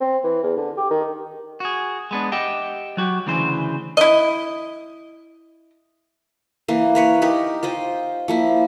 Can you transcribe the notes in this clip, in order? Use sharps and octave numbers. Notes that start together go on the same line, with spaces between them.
C4
E3
E2
D3
G4
D#3
F#4 G#4
G#3 B3 D4
G4 D#5 E5 F#5 G5
F#3 F#4 G4
D2 C#3 E3 C5
E4 D#5
E3 A#3
A#4 B4 C#5
D#4 G4 A#4
F4 C5 D#5 G5
F3 A#3 E4